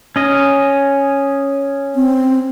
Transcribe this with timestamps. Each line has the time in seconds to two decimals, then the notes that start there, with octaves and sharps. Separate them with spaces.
0.16 C#4 D#5
1.96 C4